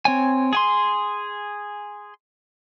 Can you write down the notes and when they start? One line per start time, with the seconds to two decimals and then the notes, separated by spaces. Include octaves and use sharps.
0.05 C4 C#5 G#5
0.53 G#4 G#5 C6